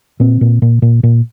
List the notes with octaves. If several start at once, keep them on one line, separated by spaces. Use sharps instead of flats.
A#2 C4
A#2
A#2
A#2
A#2